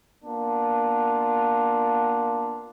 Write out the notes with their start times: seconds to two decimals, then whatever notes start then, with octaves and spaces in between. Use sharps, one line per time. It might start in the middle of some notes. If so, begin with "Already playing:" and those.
0.25 A#3 B3 D4 F4